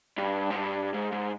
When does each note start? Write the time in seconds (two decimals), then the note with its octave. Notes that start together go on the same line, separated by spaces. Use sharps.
0.18 G2
0.50 G#2
0.55 G2
0.94 G#2
1.12 G#2